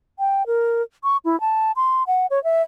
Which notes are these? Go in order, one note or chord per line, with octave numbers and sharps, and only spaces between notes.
G5
A#4
C#6
E4
A5
C6
F#5
C#5
E5